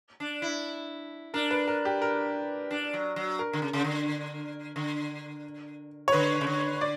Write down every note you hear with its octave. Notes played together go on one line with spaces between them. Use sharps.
D4
E4
D4 A#4
B4
A#4
G4
A#4
D4
F#3
F#3
A#4
D3
C#3
C#3
D3
D3
C#5
D3 B4
C#3
D3
D5